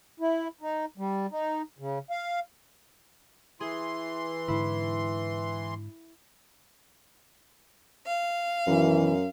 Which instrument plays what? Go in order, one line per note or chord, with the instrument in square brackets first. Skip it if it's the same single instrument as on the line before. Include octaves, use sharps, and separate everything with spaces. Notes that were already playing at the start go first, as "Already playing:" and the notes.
[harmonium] E4
D#4
G3
D#4
C#3
F5
[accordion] E3 C6 [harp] G#4
[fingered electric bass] G#2 D3 [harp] E4
[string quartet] F5
[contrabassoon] F#2 [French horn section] B2 D#3 E3